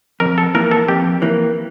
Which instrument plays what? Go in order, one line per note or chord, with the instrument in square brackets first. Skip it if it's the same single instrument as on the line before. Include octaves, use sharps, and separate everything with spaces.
[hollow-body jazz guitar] F2 [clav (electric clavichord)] A#4
[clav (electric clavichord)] A4
[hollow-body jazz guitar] E3 A#3 [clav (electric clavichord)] A#4
[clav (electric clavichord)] A4
[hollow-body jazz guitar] F2 [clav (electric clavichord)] G4
[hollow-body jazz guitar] E3 A#3